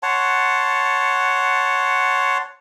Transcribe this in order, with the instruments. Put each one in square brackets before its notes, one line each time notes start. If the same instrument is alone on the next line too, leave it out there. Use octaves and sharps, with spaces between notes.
[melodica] C#5 F#5 A5 C6